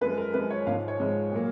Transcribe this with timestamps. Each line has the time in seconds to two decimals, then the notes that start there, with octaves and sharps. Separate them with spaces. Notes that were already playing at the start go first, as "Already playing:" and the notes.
0.01 F#2 F3 G#3 B4
0.18 A#4
0.34 F#2 F3 G#3 B4
0.51 C#5
0.67 G#2 F3 G#3 F5
0.88 C#5
1.00 G#2 F3 G#3
1.32 A#2 F#3 A#3